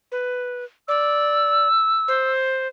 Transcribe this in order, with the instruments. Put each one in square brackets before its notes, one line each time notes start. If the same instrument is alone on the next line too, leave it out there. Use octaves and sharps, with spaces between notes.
[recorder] B4
[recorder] D5 [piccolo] E6
[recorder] C5